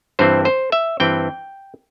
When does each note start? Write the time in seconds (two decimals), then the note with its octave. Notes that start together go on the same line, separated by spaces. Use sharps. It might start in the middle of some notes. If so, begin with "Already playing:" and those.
0.19 G2 E3 C4 C5
0.45 C5
0.72 E5
1.00 G2 E3 C4 G5